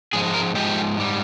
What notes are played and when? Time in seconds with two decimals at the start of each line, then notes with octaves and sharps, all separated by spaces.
0.13 G#2 F3 G#3 G#4
0.34 A#4
0.55 G#2 F3 G#3 G4
0.97 G#2 G3